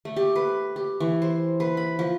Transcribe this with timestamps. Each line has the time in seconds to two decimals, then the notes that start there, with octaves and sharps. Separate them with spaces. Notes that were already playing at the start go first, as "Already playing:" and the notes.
0.05 A3
0.16 G4
0.36 B4
0.76 G4
1.00 E3
1.22 C5
1.60 B4
1.77 B5
1.99 F3